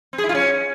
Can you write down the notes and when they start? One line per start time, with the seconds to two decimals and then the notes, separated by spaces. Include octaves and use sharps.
0.13 C4
0.18 G#4
0.24 E4
0.29 F4
0.35 C#4